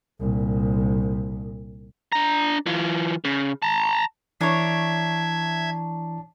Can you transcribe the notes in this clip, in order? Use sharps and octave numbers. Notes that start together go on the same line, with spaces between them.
C2 A#2
D4 A#5
E3 F4
C#3
A5 A#5
E3 D4 E4 C#5 E5 A#5 G#6